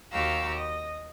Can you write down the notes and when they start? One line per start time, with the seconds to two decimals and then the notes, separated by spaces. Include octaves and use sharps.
0.11 D#2 F#4 G4 F5 A#5 E6
0.54 D#5